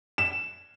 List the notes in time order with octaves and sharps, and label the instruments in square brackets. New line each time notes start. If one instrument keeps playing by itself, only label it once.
[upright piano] E7